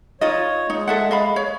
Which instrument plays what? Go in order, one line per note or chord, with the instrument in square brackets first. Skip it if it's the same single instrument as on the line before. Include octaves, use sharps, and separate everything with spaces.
[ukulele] D#4 F4 D#5 [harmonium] C#5
[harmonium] G#3 [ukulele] D#4
[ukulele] A4 E5 F#5
D#5 F5 B5
C#5